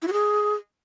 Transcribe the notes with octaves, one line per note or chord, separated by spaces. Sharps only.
E4
F#4
G#4